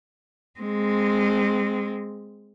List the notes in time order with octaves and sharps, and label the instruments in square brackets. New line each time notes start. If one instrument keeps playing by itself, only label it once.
[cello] G#3 C4